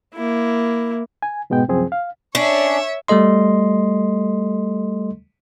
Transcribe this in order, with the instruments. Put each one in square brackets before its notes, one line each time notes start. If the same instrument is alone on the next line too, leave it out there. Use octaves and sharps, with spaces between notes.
[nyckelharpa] A#3 E4
[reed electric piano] G#5
G#2 B2 G#3 B3 G5
C2 F#2 F3 C4 G#4
F5
[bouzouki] C#4 D4 [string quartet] C#5 E5
[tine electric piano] G3 A3 A4 D#5 C6